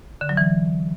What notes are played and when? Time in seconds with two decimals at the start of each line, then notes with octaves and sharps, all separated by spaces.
0.21 D3
0.29 F#3
0.37 E3